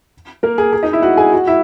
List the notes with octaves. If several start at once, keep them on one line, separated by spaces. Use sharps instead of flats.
A#3 A#4
G#4
G#4
D#4 D#5
E4 E5
F#4 F#5
G#4 G#5
F#4 F#5
E4 E5